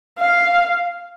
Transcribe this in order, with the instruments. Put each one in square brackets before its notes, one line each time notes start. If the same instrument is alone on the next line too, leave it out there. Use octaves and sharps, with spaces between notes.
[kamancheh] F5